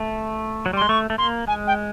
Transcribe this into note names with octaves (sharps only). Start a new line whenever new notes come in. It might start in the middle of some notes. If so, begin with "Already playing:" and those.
Already playing: A3
F#3
G3
G#3 C6
A3 C#6
A3
A#3 C6
G#3 G#5
G5